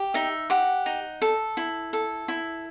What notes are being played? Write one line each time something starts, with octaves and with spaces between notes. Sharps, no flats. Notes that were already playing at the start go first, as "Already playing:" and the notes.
Already playing: G4
D#4 E5
G4 F#5
D#4
A4
E4
A4
E4